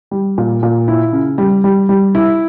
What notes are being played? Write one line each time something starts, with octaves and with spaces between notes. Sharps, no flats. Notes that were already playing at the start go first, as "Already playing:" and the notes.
G3
A#2
A#2
E4
C#3
G3
G3
G3
E4